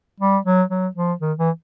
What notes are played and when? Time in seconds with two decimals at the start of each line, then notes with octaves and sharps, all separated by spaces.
0.20 G3
0.45 F#3
0.70 F#3
0.95 F3
1.21 D#3
1.38 E3